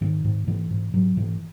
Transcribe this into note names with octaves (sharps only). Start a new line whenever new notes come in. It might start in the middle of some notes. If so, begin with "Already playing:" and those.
G#2 D#3
G#2
G#2 E3
G#2
G#2 F#3
G#2 E3